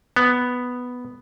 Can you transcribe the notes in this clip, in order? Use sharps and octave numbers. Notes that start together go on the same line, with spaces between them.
B3